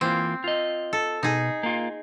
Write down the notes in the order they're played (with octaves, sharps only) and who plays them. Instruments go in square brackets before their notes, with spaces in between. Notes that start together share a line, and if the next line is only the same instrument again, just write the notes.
[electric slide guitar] E3 A#3 F4 [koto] C4
[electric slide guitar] F4 D#5
[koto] A4
[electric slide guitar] B2 [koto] D#4 G#4
[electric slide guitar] A#3 F4